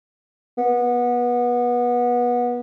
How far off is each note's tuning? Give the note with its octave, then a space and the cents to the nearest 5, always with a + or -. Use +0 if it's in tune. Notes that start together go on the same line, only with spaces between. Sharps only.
B3 -25